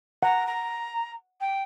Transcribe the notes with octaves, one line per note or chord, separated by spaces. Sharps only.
F#5 A#5
A#5
G5